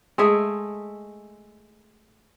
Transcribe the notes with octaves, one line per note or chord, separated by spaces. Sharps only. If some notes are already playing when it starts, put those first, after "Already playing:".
G#3 A3 G#4 E5